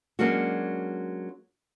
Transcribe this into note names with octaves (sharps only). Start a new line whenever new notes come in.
F#3 G#3 A#3 C#4 D4 F#4